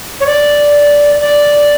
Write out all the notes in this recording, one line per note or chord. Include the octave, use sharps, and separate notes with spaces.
C#5
D5
D5